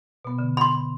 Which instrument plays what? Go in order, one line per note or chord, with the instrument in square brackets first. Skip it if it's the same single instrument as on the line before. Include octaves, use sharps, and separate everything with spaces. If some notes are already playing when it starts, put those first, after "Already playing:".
[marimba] B2 B3
D3
[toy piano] B5 C6